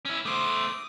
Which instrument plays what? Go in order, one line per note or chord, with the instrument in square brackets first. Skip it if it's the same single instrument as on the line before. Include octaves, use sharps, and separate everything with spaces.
[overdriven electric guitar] C#4 E4
[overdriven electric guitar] A3 C5 [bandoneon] D6 D#6